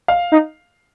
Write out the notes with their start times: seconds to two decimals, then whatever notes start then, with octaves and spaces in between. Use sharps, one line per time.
0.08 F5
0.32 D#4